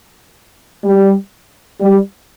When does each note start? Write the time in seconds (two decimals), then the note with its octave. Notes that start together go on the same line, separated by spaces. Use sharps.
0.84 G3
1.81 G3